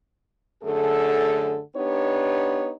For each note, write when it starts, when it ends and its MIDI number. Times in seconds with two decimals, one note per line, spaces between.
0.64 1.59 42
0.64 1.59 50
0.64 1.59 57
0.64 1.59 68
0.64 1.59 69
1.75 2.70 59
1.75 2.70 62
1.75 2.70 63
1.75 2.70 67
1.75 2.70 71
1.75 2.70 73